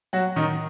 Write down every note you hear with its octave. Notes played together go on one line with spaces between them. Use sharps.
F#3 F#4
D#3 D#4